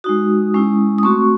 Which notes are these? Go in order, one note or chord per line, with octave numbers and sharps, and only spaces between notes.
G#3 D#4 F#4 D#6
G#3 C#4 E4
D#6
A3 C4 F#4 C#6